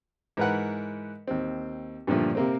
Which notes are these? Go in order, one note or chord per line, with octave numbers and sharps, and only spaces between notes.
G#2 E3 A#4 B4 F#5
D#2 C4
G2 A#2 D3 F3 A3
C3 A#3 C4